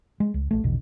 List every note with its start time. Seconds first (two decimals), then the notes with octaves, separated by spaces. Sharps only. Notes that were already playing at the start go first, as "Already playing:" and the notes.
0.20 G#3
0.34 C#2
0.51 A#1 A3
0.63 A#1 E2 B2 D3